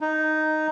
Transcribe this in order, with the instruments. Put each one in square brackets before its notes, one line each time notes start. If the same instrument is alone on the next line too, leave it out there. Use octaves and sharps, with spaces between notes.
[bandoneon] D#4